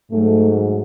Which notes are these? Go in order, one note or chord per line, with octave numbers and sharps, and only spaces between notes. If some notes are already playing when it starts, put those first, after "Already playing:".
G#2 F#3 A3